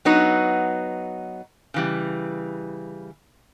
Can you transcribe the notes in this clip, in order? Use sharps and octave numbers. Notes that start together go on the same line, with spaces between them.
F#3 B3 D#4
C#3 E3 G3